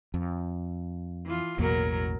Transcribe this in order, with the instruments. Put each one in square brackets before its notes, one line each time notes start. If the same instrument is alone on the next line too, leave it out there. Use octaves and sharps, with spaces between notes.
[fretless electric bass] F2
[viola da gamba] E3 F4
[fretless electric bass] A1 E2 A#3 [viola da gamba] B2 F#3 A#4